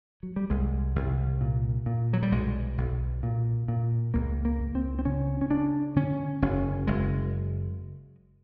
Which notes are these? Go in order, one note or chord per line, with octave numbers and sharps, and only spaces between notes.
F#3
G3
C2 G#3
C2
A#2
A#2
F#3
G3
B1 G#3
B1
A#2
A#2
C#2 A#3
A#3
C#2
C4
C4
C#3 C#4
C#4
C#3 D4
D3 C#4
F#1 C#4
F#1 G#3